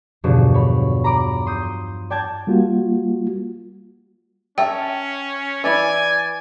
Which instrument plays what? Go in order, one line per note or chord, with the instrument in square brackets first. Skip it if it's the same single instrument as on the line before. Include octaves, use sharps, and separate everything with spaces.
[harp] E2 G2 B2 D3 F3 F#3
C#5 B5
A#5 B5 D6 D7
C6 D#6 G6
D5 G5 A5 G#6 A6
[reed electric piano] G3 A#3 F4 F#4
[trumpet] C#4 [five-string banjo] A#4 E5 A5 [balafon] G5
[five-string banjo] E3 E4 [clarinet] D5 [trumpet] G#5